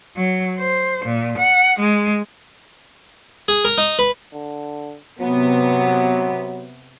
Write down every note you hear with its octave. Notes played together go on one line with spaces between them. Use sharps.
F#3
C5
A#2
F#5
G#3
G#4
A#4
D#4
B4
D3
C3 F#3 B3